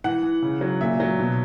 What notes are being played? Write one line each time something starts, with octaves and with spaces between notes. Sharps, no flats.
E3 F#5
E3
C#3
F#3
A#2 E5
F#3
B2